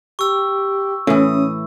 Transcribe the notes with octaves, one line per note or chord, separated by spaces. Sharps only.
G4 C#6 E6
A2 E3 C#4 D#6